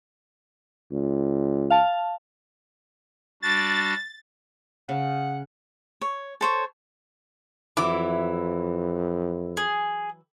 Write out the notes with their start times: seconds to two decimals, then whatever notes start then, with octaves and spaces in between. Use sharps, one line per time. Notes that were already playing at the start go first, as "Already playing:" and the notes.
0.92 C#2
1.70 F5 A5
3.42 G3 D4 F#4 A6
4.89 C#3 F#5
6.01 C#5
6.41 A4 C5 C#5
7.77 F2 E3 F#3 E4 D6
9.57 G#4